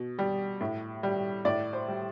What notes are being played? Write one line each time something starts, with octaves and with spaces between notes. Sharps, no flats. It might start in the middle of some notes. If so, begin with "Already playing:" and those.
Already playing: B2
G3
A2
G3
A2 D5
C5
G3